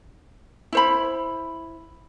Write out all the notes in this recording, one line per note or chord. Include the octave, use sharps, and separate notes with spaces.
E4 C5 B5